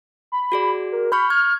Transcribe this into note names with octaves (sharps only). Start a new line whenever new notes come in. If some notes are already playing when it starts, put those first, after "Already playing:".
B5
F#4 G#4 D5
A#4
B5 C#6 F6 G6
F6 G#6